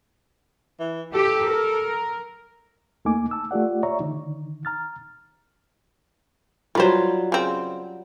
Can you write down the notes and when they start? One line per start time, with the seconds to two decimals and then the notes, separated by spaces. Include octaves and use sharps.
0.80 E3
1.14 G4 A4
1.50 A#4
3.05 D#2 A3 A#3 D#4 G#5 D6
3.31 A5 E6
3.51 A3 F4 G4 D5 F#5
3.83 C#5 D5 E5 A#5 C#6
4.00 D3 D#3 D#4
4.65 A#5 F6 A6
6.75 D#3 F#3 G3 F4 B4 C5
7.32 C#3 C4